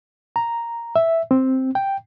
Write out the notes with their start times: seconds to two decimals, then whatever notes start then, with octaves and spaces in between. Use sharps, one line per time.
0.36 A#5
0.96 E5
1.31 C4
1.75 G5